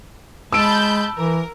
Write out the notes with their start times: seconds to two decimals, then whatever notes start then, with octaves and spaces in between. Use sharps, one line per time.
0.53 G#3 A5 B5 E6 G6 D7
1.18 E3 A#4